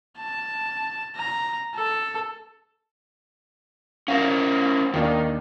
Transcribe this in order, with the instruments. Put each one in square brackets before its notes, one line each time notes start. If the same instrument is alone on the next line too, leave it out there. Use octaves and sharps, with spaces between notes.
[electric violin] A5
A#5
A4
[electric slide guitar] C#4 A#4 C5 [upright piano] F5
[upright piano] D#2 A#3 D4 [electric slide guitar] D#3